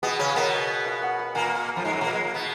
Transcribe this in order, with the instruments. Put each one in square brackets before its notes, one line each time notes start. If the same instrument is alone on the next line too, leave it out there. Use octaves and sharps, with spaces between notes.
[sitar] B2 B3 [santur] G#4
[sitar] C#3 C#4
[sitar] B2 B3 [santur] A#4
[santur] F5
F#5
F#5
[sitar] A#2 A#3 [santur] G#5
[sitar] F2 F3
G#2 G#3
F#2 F#3
A#2 A#3
G#3
A#3
B2 B3